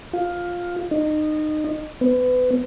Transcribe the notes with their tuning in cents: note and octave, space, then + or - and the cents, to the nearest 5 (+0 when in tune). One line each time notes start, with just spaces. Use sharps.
F4 +10
D#4 -25
B3 +30